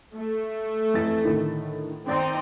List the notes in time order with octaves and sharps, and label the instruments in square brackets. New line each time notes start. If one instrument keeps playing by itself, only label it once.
[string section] A3
[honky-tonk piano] F2 E3 A6
A2 D3 D#3
[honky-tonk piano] G#1 D5 A6 [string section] C4 D#4